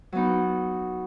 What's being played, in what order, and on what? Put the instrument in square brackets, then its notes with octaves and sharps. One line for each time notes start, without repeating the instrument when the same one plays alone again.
[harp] F#3 B3 D#4